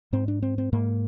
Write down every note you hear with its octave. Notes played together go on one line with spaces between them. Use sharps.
G#2 C4
D4
C4
C4
G#2 A#3